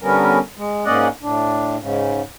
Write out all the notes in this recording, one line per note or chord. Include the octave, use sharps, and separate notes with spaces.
D3 G3 B3 C#4 A#4
G#3
G#2 A#3 C#4 D5 D#5 F#5
A2 D4
G#2 C#3